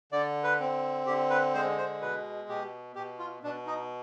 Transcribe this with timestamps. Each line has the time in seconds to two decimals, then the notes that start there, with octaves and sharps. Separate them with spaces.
0.12 D3 D5
0.44 B4
0.60 C4
1.06 D3 G4
1.30 B4
1.54 G#3 C5
1.78 C5
2.01 B2 B4
2.48 B2 G4
2.96 B2 G4
3.19 F4
3.43 B2 D4
3.67 D#4